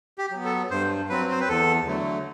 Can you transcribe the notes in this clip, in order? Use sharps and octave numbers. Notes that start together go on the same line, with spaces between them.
G4
F#3 B3
A4
G2 C5
F#3 C4 B4
C5
B4
E2 A4
D3 F#3 A3